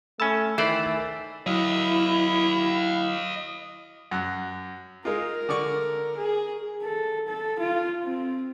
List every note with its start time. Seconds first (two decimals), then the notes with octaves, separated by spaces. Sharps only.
0.20 A3 C#4 G#5 A5 B5 E6
0.58 D#3 E3 A3 C5 D5
1.46 F#3 E4 D#5 F5
4.11 F#2 F#5
5.05 G#3 D#4 F4 A#4
5.49 D3 D5 C#6
6.16 G#4
6.84 A4
7.28 A4
7.59 F4
8.04 C4